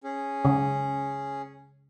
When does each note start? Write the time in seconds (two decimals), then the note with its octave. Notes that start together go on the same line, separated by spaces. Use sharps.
0.04 C#4 G#4
0.45 C#3